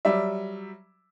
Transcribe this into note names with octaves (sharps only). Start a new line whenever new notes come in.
F#3 G3 D5 E5